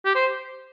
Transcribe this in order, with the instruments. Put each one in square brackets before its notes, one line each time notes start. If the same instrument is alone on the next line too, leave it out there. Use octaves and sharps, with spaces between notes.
[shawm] G4
C5